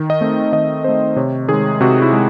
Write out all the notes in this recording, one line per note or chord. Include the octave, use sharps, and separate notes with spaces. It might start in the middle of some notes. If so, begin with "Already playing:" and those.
Already playing: D#3
D#5
A3 C4
D#3 D#5
A3 C4 C5
C3 C#5
D#3 G#3 G#4
C3 F#4
E4
G#3